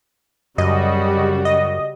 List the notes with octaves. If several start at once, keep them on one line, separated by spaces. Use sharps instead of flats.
F#2 C#3 G3 F#4 D#5
D#5